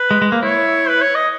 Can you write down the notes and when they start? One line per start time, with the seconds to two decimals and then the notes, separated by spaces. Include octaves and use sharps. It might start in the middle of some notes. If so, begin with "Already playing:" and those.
Already playing: B4
0.11 G#3
0.22 G#3
0.32 A#3
0.43 E4 C#5
0.88 B4
1.01 C#5
1.15 D#5